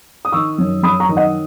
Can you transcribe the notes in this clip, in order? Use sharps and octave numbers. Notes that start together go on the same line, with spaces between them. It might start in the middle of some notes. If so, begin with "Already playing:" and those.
D#6
D#3 C#6 E6
F#2
F#2 B5 D#6
A#5 C#6
D#3
D#5 F#5